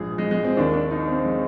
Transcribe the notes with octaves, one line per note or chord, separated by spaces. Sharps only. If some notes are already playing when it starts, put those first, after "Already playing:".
Already playing: A#1 G#2 F3 G#4
G#3
G#3
C4
D#2 D#3 D4
D4
D#4
C4
G#3